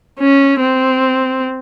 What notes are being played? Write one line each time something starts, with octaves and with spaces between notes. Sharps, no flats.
C#4
C4